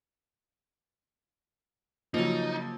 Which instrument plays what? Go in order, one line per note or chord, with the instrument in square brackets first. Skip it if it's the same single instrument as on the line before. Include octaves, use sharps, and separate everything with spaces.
[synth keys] C#3 A#3 [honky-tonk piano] F3 F#3 [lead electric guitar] D#4